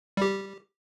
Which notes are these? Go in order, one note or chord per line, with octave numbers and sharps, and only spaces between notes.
G3 G4